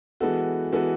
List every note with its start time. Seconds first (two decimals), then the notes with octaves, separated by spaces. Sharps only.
0.20 E3 G#3 B3 F#4 A4
0.72 E3 G#3 B3 F#4 A4